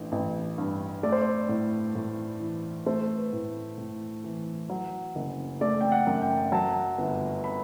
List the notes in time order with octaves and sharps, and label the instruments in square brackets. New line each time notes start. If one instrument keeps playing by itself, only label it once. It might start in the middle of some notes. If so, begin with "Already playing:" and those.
Already playing: [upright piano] A1 D3
A1
G2
A3 D5
C5
D5
A2
A2
E3
A3 C5
B4
A2
A2
E3
F#3
F#1
A3 D5
G5
F#5
F#2
G5
F#3 A5
G1
B5